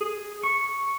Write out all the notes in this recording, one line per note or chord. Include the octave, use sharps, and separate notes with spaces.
G#4
C#6